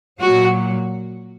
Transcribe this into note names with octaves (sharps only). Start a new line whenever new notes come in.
A#2 F#3 F#4